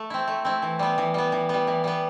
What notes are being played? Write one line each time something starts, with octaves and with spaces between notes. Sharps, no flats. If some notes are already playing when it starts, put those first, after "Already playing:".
Already playing: A3
C4 E4
A3
C4 E4
E3
G3 B3
E3
G3 B3
E3
G3 B3
E3
G3 B3